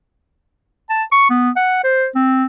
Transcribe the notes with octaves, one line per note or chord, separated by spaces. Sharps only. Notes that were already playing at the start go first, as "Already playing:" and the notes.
A5
C#6
B3
F#5
C5
C4